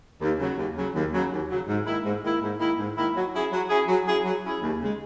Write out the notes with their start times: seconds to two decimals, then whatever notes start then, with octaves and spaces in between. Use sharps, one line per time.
0.21 D#2
0.39 C#3 F#3
0.57 D#2
0.76 C#3 F#3
0.95 D#2
1.13 C#3 F#3
1.31 D#2
1.49 C#3 F#3
1.68 G#2
1.86 D#3 A#3 E4
2.04 G#2
2.22 D#3 A#3 E4
2.41 G#2
2.59 D#3 A#3 E4
2.77 G#2
2.97 D#3 A#3 E4
3.15 F#3
3.33 C#4 E4 G#4
3.52 F#3
3.70 C#4 E4 G#4
3.87 F#3
4.06 C#4 E4 G#4
4.24 F#3
4.43 C#4 E4 G#4
4.61 D#2
4.79 C#3 G#3